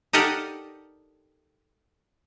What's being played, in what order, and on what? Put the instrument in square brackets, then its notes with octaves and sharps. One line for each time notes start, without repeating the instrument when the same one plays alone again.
[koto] D#4 G4 A4 A#4 D5 F#5